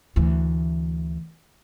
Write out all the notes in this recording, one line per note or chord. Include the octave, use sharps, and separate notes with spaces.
D2 E3